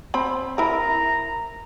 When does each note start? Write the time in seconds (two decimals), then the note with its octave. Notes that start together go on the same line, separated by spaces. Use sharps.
0.14 C4 B5
0.58 E4 A#4 A#5